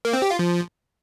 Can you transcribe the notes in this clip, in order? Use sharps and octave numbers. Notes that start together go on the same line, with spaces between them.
A#3
C4
G4
F4
F3